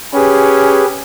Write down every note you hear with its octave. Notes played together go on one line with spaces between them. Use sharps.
C#4 G4 G#4 B4